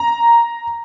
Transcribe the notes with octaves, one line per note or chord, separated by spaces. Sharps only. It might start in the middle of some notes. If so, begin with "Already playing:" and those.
Already playing: A#5